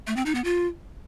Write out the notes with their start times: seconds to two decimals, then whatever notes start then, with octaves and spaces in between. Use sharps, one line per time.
0.07 A3
0.16 C4
0.26 D#4
0.35 B3
0.44 F4